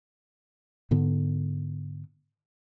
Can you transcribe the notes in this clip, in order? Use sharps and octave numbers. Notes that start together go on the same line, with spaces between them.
G#2 D3 B3